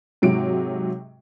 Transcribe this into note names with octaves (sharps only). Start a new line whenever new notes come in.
G#2 C3 F#3 D7